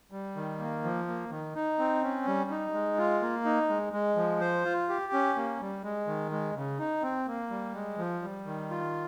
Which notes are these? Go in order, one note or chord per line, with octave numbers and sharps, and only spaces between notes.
G3
D#3
A#3
F3
A#3
D#3
D#4
C4
C#4
G3
D#4
G#3
F4
A#3
D#4
G#3
G#3
F3
C5
F4
G4
C#4
A#3
G3
G#3
D#3
G#3
C#3
D#4
C4
A#3
G3
G#3
F3
G3
D#3
F4